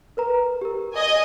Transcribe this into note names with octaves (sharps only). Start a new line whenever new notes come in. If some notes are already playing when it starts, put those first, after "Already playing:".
A#4 B4 A#5
G4 A#4
D#5 G#5